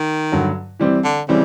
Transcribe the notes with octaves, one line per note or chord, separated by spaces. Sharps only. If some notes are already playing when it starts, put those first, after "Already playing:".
Already playing: D#3
G2 D3 F#3
E3 G3 C4
D3
C#3 E3 G3 C4